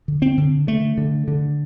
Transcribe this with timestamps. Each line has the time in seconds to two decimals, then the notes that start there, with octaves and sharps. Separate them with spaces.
0.08 D3
0.22 C4
0.37 D3
0.67 D3 A3
0.98 D3
1.28 D3